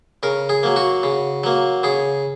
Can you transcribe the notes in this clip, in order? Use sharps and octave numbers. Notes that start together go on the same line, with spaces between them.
C#3 A#4
G#4
F#3 A#3
F#4
C#3
F#3 A#3
C#3 G#4